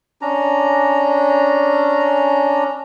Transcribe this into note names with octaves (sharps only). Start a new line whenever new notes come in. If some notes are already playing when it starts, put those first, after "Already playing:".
C#4 D4 A#5